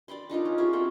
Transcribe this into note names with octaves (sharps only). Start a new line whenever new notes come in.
D5 G5 B5 C6
D4 D#4 F4 A#4
C#4
E4 F4 G4 G#4
A#3 C4 F#4 G5